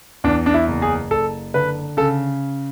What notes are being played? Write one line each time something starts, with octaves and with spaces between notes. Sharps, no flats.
E2 D4
D4
E4
F#1
G#4
F#1 A4
D3 B4
C#3 A4